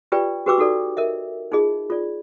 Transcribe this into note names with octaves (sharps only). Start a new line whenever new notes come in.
F4 G4 B4 D5 G5
F#4 G4 B4 G5 D6 E6
D#4 F#4 A4 D5
A#4 D#5 E5
D#4 F4 G#4 D#5
F4 D5